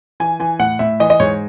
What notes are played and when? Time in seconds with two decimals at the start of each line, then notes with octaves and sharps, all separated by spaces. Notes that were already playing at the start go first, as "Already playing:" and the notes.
0.20 E3 G#5
0.40 E3 G#5
0.59 A2 F#5
0.79 A2 E5
1.00 E3 D#5
1.10 D#5
1.20 G#2 C#5